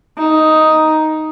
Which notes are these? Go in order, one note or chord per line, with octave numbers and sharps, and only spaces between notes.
D#4